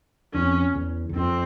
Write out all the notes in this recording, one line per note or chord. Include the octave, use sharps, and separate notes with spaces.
F2 C#4
E2
E2
F2 C4